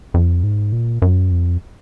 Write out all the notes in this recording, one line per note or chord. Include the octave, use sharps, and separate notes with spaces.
F2
G#2
A#2
F#2
F2